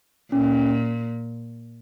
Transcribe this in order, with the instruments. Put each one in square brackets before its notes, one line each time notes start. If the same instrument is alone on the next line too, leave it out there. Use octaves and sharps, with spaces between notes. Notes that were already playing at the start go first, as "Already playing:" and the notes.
[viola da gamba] A#2 [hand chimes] C#4